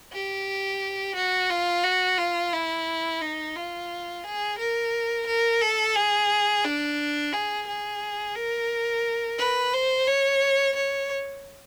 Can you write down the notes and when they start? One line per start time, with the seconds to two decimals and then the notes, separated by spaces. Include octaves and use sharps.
0.12 G4
1.15 F#4
1.50 F4
1.84 F#4
2.18 F4
2.53 E4
3.21 D#4
3.56 F4
4.24 G#4
4.59 A#4
5.27 A#4
5.62 A4
5.95 G#4
6.65 D4
7.33 G#4
7.67 G#4
8.36 A#4
9.38 B4
9.74 C5
10.08 C#5
10.76 C#5